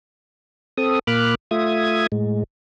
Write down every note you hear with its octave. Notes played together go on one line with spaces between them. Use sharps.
C4 A4 D#6
A#2 A#3 B5 D6 F6 F#6
A3 F4 E5 D#6 G#6
A2 G#3